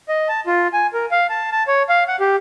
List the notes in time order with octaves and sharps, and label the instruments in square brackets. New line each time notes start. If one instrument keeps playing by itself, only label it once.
[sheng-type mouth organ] D#5
A5
F4
G#5
A#4
F5
A5
A5
C#5
F5
F#5
G4